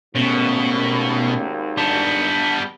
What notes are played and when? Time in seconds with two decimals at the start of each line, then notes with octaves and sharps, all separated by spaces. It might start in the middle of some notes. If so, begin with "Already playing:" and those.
0.15 G#1 D#2 B2 A3 C#4
1.77 G3 B3 D4